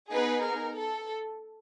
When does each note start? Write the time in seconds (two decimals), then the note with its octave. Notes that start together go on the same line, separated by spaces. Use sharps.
0.11 B3 D#4 G#4 B4
0.44 A#4
0.76 A4